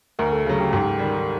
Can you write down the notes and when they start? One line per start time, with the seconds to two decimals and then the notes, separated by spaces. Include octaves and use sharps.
0.19 D2 A#4
0.32 A4
0.45 C#3 F#3 G#4
0.60 G4
0.73 G#2 G4
0.99 D#3 G3